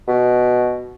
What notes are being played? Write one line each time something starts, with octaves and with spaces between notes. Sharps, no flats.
B2